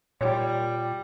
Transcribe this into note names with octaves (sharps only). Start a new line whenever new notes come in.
A#2 G3 C#5